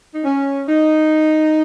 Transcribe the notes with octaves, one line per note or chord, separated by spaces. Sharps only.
D#4
C#4
D#4